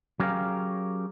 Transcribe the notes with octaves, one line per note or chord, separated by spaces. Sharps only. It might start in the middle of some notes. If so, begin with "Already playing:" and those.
F#3 C#4 G4 G#4 A#4 F5